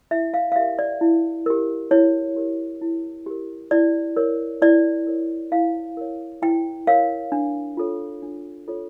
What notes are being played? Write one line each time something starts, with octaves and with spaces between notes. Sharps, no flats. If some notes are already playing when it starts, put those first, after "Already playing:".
E4 E5
F5
F5
G4 A#4 E5
D5
E4
G4 A#4
E4 C#5
G4 A#4
E4
G4 A#4
E4 D5
A#4 C#5
E4 D5
A#4 C#5
E4 F5
A#4 C#5
E4 G5
A#4 C#5 F5
D4
F4 A4 C#5
D4
F4 A4 C#5